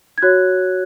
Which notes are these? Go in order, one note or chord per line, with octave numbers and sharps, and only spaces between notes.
G#6
F#4 C#5 F#6